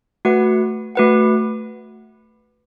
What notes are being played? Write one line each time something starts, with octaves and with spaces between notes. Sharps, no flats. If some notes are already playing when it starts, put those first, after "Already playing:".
A3 F#4 B4 F#5
A3 F#4 B4 F#5